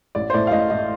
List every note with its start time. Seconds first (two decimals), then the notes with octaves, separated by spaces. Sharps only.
0.15 A1 D5
0.30 C5
0.34 A2 A3 D5
0.47 F5
0.51 A1 D#5
0.70 A2 A3 D#5